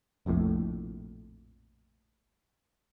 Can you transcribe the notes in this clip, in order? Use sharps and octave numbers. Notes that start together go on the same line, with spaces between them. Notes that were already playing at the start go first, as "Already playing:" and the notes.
F1 A#1 F2 A2